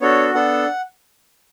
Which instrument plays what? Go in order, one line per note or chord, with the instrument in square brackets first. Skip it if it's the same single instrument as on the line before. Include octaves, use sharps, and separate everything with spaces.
[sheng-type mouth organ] B3 D4 F#4 A4 C#5
B3 D4 A4 F#5